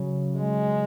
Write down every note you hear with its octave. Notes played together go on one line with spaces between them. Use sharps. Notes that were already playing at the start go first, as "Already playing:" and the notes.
Already playing: C#3 F#3 C#4
G#3